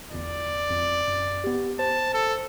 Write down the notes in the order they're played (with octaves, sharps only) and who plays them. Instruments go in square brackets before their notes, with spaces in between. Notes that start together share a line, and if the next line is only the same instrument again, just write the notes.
[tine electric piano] G1 E2 [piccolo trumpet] D5
[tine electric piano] F2
F#2
B3 G4
[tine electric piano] C5 [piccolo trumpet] A5
[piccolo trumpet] A4